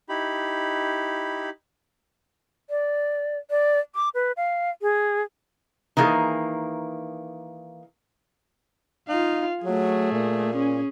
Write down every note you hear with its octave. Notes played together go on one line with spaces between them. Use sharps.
D#4 E4 G4 B5
D5
D5
D6
B4
F5
G#4
D#3 E3 A#3 G#4
D#4 F4 F5
F#3 A3 G#4
A#2
C#4 G#4